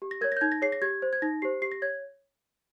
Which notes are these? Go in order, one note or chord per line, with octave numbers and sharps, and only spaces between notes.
G4
A#6
A#4 C#5 G#6
G6 A#6
D#4 G#6
A#6
G#4 C#5 C7
A#6
G4 G#6
C5
G#6
D#4 A#6
G4 C5 C7
G4 C7
A#6
C#5 G#6